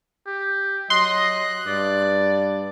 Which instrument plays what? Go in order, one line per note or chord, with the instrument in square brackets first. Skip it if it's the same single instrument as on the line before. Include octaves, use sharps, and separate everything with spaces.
[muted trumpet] G4
[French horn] F#3 [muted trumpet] D#5 [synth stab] C6 [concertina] F#6
[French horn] G2 [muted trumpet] D5